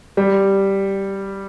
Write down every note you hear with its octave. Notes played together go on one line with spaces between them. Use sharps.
G3